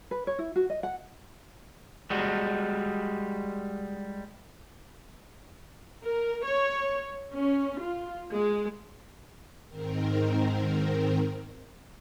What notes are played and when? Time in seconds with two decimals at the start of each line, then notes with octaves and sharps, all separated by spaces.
0.11 B4
0.27 C#5
0.39 E4
0.56 F#4
0.70 D#5
0.83 F#5
2.10 G3 G#3 F#4
6.04 A#4
6.44 C#5
7.34 C#4
7.81 F4
8.32 G#3
9.68 G#2 D#3 C4 A#4